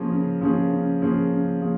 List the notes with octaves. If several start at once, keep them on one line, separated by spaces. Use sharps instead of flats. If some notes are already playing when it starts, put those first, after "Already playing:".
Already playing: C#3 F3 A#3 C#4 G#4
C#3
F3 A#3 C#4 G#4
C#3
F3 A#3 C#4 G#4
C#3
F3 A#3 C#4 G#4